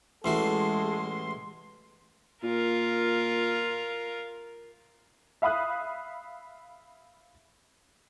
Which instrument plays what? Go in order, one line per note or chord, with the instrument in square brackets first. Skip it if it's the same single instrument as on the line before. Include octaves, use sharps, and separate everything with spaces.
[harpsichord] A1 E3 F#4 [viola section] G#3 [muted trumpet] A4 [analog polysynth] C6
[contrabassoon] A#2 [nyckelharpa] F4 A#4
[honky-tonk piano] E5 F5 B5 D#6 F#6